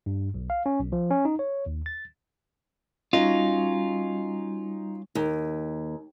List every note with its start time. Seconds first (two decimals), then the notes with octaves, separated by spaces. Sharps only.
0.06 G2
0.34 B1
0.50 F5
0.66 C#4
0.79 B1
0.92 F3
1.11 C#4
1.25 D#4
1.39 C#5
1.66 D#2
1.86 A6
3.13 G3 C#4 D#4 F4 F#4 D#5
5.15 D#2